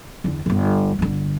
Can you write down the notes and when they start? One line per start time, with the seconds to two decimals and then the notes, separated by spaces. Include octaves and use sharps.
0.24 E2 D3
0.46 D1 G1
0.99 G1 D3